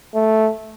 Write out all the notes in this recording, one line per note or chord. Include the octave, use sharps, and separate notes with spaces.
A3